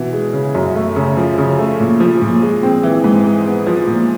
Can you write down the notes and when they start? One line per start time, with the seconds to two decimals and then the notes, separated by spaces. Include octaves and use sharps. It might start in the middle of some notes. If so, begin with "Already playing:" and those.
Already playing: B2 E3
0.13 G#3
0.33 C#3
0.55 F#2
0.75 A3
0.96 C#3
1.17 F3
1.38 C#3
1.59 A3
1.80 A#2
2.00 F3
2.22 A#2
2.42 G#3
2.63 C4
2.83 E3
3.04 G#2
3.25 G#3
3.47 B3
3.67 F3
3.87 A#2